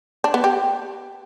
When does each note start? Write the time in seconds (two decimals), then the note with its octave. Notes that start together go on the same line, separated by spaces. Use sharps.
0.24 D4
0.34 B3
0.44 G4